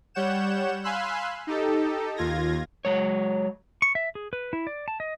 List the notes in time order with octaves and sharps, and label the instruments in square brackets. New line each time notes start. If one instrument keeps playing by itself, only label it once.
[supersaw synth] G3 C#5 F#5 G6 E7
F5 G#5 B5 C6 E6 F#6
D#4 G4 A4
D#2 F4 G#6 A#6
[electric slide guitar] F#3 G#3 C#5
[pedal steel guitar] C#6
E5
G#4
B4
E4
D5
A5
D#5